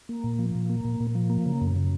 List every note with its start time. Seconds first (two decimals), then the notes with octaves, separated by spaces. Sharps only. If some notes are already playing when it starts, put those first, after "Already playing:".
0.09 A#3
0.24 A#2
0.39 F3
0.55 A#2
0.70 A#3
0.84 A#2
1.00 A#2
1.15 F3
1.30 A#3
1.46 C#3
1.61 F#2
1.76 C#3